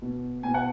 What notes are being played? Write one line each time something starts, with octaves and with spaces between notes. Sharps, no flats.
B2
B2 G#5
F#5